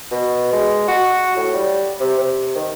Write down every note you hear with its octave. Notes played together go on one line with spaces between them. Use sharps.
B2
G#3
F#4
A2
G3
C3
C3
D#3